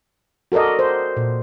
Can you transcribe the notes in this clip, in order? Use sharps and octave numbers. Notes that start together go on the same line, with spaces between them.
F#4 A4 A#4 D5 D#5
C5
A#2